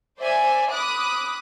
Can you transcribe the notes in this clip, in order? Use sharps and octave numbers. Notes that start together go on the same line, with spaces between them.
C5 D5 E5 G#5
B5 D6 D#6 F#6